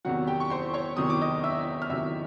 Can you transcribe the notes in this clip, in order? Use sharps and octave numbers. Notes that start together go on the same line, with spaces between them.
E2 C3 D#3 F#3 F#4 F#5
G4 G5
C#6
C5 C6
C#5 C#6
E2 C3 D#3 F#3 D#6
D6
D#5 D#6
E5 E6
F6
E2 C3 D#3 F#3 E5 E6